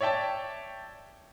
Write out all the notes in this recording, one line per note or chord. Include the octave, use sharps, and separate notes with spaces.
C#5 D5 E5 G5 A5